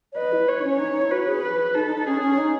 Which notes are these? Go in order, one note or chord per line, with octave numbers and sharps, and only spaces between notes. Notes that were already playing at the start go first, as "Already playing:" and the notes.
C#5
B4 D#5
E4
C#5
D#4
C#4
D#4 C#5
D#4
E4
F#4 B4
G#4
B4
D#4 A4
D#4
D#4
C#4 G#4
C#4
D#4